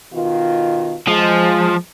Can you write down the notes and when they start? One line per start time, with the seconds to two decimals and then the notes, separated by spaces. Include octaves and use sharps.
0.13 B2 D#3 F4
1.08 F3 G#3